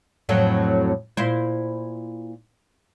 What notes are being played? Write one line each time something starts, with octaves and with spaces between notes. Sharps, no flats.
F2 A2 F#3
A#2 E4 C5